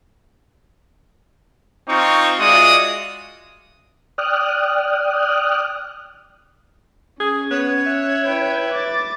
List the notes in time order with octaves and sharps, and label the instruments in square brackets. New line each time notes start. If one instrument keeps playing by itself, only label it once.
[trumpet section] C4 D#4 F4 C#6
G#3 F4 F#4 D5 E5 D#6
[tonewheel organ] D5 G5 D#6 F6 F#6
[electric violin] C#4 [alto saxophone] G#4
[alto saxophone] B3 [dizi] C#5
[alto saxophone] E5 [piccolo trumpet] F#6
[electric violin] E4 G5 [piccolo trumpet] B4
[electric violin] D6 A6